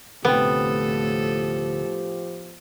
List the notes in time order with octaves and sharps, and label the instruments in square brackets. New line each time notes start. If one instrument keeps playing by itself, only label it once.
[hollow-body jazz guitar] D2 C3 G5 [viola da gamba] A2 A4 [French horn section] F3 G4 [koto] B3